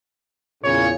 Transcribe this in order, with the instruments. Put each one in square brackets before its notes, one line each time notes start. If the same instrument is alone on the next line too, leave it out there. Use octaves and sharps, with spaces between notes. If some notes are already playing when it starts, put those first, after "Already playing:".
[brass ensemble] E2 A#2 C#3 [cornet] C#5